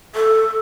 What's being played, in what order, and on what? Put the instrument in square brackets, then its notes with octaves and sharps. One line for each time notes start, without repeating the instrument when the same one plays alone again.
[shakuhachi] A4